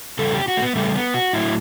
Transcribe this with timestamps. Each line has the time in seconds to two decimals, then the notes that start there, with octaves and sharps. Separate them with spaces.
0.19 E2 C#3 G3 A4
0.34 G4
0.48 F#4
0.57 A3
0.62 B3
0.76 E2 C#3 G3 A3
0.95 B3
1.14 F#4
1.33 A2 F#3 E4